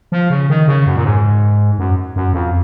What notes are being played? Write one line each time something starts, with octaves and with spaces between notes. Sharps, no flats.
F3
C#3
D#3
C#3
F#2
A#2
G#2
F#2
F#2
F2